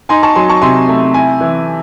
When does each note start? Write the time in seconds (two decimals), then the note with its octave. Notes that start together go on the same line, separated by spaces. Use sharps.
0.09 D#4 G#5 C6
0.23 A5 C#6
0.35 F#3 G#5 C6
0.49 A5 C#6
0.62 C3 G#5 C6
0.89 A3
1.14 E4 G#5
1.41 E3